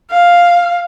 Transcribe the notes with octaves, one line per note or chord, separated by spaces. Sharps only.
F5